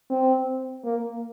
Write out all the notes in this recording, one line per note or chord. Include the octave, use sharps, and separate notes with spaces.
C4
A#3